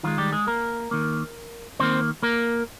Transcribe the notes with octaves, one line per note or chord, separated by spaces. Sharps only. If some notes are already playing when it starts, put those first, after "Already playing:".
D#3 F3 G#3 F4
G3 G4
G#3 G#4
A#3 A#4
D#3 A#3
D#3 A#3 C4 C5
A#3 A#4